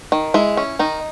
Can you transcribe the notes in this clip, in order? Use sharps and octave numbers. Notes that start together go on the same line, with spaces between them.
D#3
G#3 E4
C#4
D#3 D#4